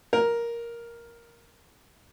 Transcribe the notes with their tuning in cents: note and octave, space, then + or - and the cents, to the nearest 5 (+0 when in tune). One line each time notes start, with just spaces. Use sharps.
A#4 +5